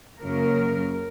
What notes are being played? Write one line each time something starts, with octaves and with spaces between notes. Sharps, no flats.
F#2 C#3 F#3 A#3 A#4